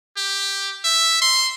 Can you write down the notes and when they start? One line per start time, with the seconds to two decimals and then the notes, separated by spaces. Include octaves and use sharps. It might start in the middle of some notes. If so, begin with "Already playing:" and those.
0.16 G4
0.84 E5
1.21 C6